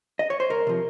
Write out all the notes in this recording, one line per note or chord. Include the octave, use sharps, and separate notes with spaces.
D#5
C#5
C5
C2 A#4
C3 F3